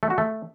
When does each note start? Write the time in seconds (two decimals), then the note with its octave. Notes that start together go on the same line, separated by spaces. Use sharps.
0.03 A3
0.10 F#4
0.18 A3